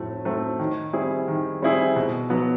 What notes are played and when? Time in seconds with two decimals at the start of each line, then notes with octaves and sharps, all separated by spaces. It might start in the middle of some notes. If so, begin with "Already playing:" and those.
Already playing: A2 F#3 A3 C4
0.25 F#3 A3 C4
0.59 D#3
0.93 G3 C4 E4 G#4
1.28 D#3
1.62 G3 C4 E4 G#4
1.96 B2
2.30 F#3 B3